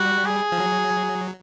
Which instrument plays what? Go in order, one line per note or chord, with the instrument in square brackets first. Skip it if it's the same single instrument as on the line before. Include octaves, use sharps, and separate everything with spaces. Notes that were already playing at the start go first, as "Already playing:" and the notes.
Already playing: [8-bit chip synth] G3 [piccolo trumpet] F#4
[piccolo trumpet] G#4
[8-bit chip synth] F3
F#3